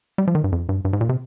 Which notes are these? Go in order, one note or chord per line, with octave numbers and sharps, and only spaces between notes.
G3
F3
D#3
G2
F2
G2
G2
G#2
A#2
C3